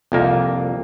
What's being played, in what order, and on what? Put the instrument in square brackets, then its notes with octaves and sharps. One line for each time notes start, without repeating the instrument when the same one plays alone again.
[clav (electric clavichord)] C2 F2 A#3